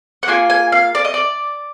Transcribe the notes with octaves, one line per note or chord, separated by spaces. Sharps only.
F#5
A#3 F4 G#4 G#5
G#5
F5
D5
D#5
D5